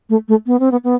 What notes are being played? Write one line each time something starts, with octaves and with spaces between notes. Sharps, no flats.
A3
A3
B3
C4
B3
B3